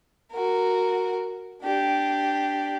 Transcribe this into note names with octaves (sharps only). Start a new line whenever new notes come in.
F#4 A#4
D4 G4